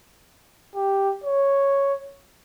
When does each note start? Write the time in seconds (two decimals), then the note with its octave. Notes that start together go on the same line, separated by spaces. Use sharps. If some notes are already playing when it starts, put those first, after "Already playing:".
0.75 G4
1.24 C#5